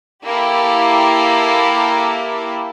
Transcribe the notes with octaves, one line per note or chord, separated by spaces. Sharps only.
A#3 E4 G4 A4